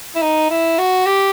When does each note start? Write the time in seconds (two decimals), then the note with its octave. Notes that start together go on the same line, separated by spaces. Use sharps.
0.16 E4
0.22 D#4
0.50 E4
0.78 F#4
1.06 G4